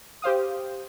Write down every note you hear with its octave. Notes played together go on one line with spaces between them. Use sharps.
G4 C5 F5 D#6